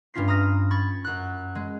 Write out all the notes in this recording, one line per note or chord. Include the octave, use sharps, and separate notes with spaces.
G2 A3 C#4 F4 B6 C7
A#5 D#6 F6 A#6
B5 C#6 G#6 A6
F#2 F#6
G#3